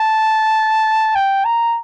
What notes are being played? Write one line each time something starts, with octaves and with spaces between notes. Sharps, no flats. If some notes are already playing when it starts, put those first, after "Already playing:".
Already playing: A5
G5
A#5